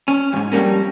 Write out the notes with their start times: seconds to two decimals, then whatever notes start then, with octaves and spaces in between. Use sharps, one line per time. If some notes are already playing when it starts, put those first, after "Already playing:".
0.08 C#4
0.33 F2 G#2
0.52 F2 G3 A#3 C#4